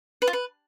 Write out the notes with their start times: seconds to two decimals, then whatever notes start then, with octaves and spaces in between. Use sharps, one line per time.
0.22 B4
0.27 F4
0.33 B4